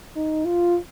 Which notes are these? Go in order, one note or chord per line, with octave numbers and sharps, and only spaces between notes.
D#4
F4